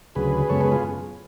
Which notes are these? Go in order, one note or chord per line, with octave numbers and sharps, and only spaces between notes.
D2 C#3 F#3 G#4 B4
F#2 C#3 G#3 B3 A4 C#5
G#4 B4
F4 G#4